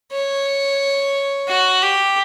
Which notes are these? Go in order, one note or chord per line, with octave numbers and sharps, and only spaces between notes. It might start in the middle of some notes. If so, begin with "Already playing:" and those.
C#5
F#4
G4